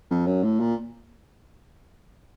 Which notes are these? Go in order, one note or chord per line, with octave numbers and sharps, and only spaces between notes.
F2
F#2
A2
A#2